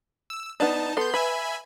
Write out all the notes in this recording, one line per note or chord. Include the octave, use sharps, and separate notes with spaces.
E6
B3 D4 D#4 A5
B3 A4 C6 G6
B4 E5 G#5 B5